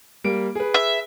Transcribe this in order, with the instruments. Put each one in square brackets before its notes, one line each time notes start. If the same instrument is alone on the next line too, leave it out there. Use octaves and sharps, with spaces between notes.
[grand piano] G3 A#3 D7
G#4 B4
[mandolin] E5